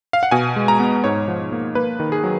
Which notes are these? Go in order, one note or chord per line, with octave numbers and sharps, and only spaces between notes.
F5
F#5
B2 G#5
G#3
A#5
B3
G#2 C#5
F3
A#3
A#3 B4
D#3
G#4
F#3